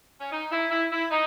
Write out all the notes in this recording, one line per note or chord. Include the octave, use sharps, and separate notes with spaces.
C#4
D#4
E4
E4
E4
D#4